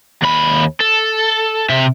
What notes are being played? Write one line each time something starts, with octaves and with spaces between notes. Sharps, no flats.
D#2 B5
A4
C3 E5